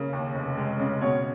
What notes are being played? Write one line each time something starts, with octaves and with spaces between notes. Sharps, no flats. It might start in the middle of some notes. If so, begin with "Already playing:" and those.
Already playing: C#3 A#3
D#2
F1
G#3
C#3
B2 C#5